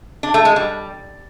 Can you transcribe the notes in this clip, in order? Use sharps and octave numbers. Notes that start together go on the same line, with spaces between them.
D4
A3
G#3
G3